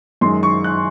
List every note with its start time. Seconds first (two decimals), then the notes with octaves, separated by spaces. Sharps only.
0.21 F#2 D#3 G#3 C6
0.43 C#6
0.64 F#6